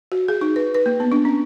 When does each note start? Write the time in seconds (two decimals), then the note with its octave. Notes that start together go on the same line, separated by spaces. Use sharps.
0.12 F#4
0.28 G#4
0.41 D#4
0.56 B4
0.74 B4
0.86 A#3
1.00 B3
1.12 D4
1.25 C#4